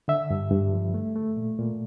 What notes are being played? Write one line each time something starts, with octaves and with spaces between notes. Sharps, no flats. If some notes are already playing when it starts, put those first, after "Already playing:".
D3 E5
G2
G2
F3
A3
A3
A#2
A#2